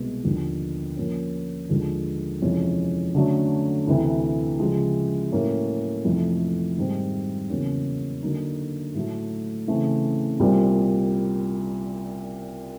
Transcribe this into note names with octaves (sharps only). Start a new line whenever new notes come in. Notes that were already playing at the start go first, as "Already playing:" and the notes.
Already playing: C2 B2 G#3
D#2 D3 F3
A#2 F3 A#3 C#4
D#2 D3 F3 G#3
F2 C3 E3 G#3 C#4
D3 F#3 A3 C#4
D2 C3 E3
C#3 F3 G#3
A2 F#3 A#3 C#4
F2 C3 E3 A3
G#2 D#3 G3 C4
E2 C#3 F#3 A#3 C#4
D3 F#3 A#3 D#4
A2 F#3 A3
C#3 E3 A3 C4
C2 A#2 G3 C4